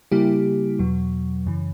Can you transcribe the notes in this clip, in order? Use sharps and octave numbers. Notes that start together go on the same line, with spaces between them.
C#3 G3 A#3 E4 G4
E2 B2 F#3
F#2 C#3 E3